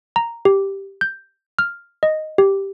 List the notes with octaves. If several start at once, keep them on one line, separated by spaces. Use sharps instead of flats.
A#5
G4
G6
F6
D#5
G4